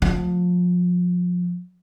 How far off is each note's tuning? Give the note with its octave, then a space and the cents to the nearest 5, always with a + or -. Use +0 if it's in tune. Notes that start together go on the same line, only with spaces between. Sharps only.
F3 +30